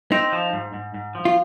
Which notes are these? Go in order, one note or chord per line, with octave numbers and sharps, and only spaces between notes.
C4 D#4
F3
G#2
G#2
G#2
F3
F4